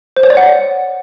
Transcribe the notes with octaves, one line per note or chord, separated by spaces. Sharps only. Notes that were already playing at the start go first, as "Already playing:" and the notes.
C5
C#5
D5
F#5